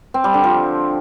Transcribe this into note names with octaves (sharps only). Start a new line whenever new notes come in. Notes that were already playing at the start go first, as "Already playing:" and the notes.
C4
G3
D3
F3